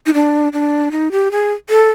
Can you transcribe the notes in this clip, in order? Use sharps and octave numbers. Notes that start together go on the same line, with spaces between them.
D#4
D4
D4
D#4
G4
G#4
A4